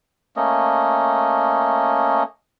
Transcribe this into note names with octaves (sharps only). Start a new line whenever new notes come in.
A3 A#3 C#4 D#5